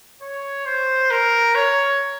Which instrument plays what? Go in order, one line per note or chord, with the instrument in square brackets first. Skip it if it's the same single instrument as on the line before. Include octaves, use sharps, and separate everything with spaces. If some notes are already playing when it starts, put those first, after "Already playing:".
[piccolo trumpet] C#5
C5
A#4
C#5